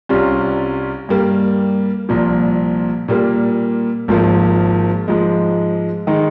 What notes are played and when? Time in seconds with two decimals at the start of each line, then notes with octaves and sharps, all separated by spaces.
0.09 C2 C3 G3 C#4 F4
1.09 G2 G3 A#3
2.09 C2 A#2 F3
3.08 A#2 G3 A#3
4.08 G#1 G#2 F3 A#3
5.08 G#2 F3 G#3
6.07 D#3 G#3 D#4